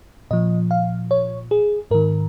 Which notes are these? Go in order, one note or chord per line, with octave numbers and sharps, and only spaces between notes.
A#2 F3 D#5
F5
C#5
G#4
G#2 D#3 A#4